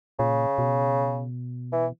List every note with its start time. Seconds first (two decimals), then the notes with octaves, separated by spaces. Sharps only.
0.19 A#2 C#3
0.58 B2
1.73 E3